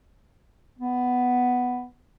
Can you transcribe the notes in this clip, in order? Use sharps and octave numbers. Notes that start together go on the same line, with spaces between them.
B3